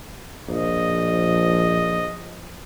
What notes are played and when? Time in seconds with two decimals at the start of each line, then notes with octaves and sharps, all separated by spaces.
0.48 A#1 F3 D#5